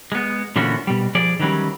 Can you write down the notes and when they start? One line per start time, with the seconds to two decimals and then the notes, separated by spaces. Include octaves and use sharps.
0.12 G#3 B3
0.56 A#2 D3 E3 B3 C#4 F#4
0.87 B2 G3
1.15 F3 G#4 D5
1.39 D#3 E3 F#3 G3 C#4